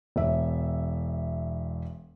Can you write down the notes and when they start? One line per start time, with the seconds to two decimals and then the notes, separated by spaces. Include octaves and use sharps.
0.16 E1 E5